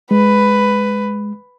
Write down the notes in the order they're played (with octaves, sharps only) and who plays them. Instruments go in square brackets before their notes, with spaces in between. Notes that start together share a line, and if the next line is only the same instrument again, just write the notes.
[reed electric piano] G#3 [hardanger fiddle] B4